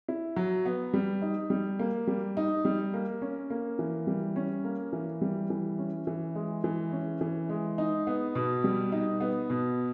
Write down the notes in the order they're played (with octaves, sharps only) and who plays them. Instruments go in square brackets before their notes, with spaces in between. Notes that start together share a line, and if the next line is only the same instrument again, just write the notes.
[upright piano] E4
F#3
B3
G3
D#4
G3
A#3
G3
D#4
G3
A#3
C#4
A#3
E3
G3
C#4
A#3
E3
G3
E3
C#4
E3
G#3
E3
C#4
E3
G#3
D#4
B3
B2
G3
D#4
B3
B2